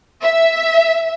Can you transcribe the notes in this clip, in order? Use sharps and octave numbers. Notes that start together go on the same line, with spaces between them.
E5